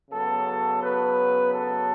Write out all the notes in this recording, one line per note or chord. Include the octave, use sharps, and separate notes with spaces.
C#3 F#3 B3 A4
B4
A4